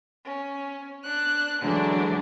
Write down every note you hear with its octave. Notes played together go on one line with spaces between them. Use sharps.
C#4
D4 F#6
D3 E3 F#3 G#3 C#4 D4